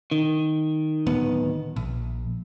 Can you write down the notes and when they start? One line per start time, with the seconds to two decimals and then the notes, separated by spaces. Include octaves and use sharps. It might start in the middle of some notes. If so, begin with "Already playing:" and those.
0.11 D#3
1.07 D1 B3
1.76 A#1